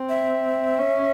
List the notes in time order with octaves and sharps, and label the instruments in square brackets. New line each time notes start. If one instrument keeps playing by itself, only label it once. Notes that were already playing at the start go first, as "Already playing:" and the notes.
Already playing: [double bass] C4
[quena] E5
[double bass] C#4